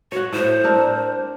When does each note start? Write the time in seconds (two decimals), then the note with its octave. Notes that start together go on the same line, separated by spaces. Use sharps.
0.12 F#4 C#5 F#5
0.33 A2 C5
0.64 C4 D4 A#4